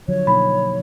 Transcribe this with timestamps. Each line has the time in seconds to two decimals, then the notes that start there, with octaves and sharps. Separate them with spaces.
0.08 D3 F3 F#3 C#5
0.27 B2 A#3 D#4 B5